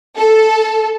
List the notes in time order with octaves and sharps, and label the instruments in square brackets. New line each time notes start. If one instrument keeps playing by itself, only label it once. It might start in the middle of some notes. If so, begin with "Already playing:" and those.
[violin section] A4